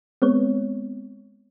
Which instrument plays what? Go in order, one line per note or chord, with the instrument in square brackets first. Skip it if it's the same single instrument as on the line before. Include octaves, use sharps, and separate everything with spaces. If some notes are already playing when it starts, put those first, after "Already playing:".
[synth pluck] G#3 B3 C4 C#5